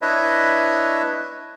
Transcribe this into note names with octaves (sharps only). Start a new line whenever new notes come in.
D4 E4 B4 C#5 D#5 E5